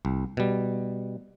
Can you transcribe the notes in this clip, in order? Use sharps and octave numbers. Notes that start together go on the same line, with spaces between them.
C2
B2 G3